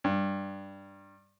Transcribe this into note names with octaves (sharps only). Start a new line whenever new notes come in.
G2